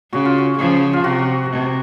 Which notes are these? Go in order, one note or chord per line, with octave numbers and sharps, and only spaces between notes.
C#3 F#4
F4
F#4
C#3 F3
F4
C3 F#4
C3